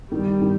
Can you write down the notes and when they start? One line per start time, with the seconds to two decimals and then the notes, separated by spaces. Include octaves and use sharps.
0.11 D#3 G3
0.41 D#3